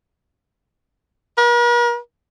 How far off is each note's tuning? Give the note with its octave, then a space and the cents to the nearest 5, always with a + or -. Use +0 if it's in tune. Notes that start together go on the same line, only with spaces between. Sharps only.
A#4 +45